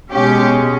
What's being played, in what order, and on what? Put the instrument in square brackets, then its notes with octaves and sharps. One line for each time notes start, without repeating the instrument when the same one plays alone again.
[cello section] B2 G#3 C#4 G4